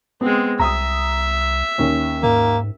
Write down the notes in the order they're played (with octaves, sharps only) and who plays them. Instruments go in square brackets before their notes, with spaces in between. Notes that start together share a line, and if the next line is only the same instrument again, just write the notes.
[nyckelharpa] G#3 C4 [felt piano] B3
[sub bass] C2 [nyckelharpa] E5 [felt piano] A#5 D#6
[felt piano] D#2 C#4
[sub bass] G#2 [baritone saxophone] A#3